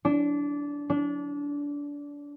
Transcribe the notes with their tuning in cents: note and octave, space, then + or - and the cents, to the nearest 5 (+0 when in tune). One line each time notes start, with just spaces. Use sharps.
D4 -20
D4 -25